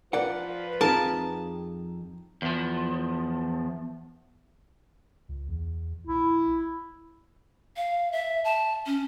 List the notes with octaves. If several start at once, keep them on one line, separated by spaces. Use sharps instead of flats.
F3 F4 A#4 B4 D5 F#5
F2 C4 D#4 G#4 A#4 A5
E2 F3
C#2
E2
A#1 E4
F5
E5
A5
C#4